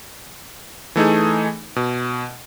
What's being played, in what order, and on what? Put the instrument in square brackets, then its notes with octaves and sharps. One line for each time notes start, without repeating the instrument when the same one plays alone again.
[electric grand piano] E3 A3 D#4 G#4
B2